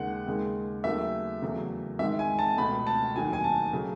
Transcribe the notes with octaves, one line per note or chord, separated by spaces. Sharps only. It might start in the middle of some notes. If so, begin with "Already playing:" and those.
Already playing: D#2 C#3 G#3 F#5
D#2 C#3 G#3
D#2 C#3 F#3 A3 E5
E2 C#3 F#3 A3
G#2 D#3 G#3 E5
G#5
A5
C#2 B2 A3 B5
A5
D#2 D#3 F#3 A3 G#5
G#5
A5
C#3 F#3 A3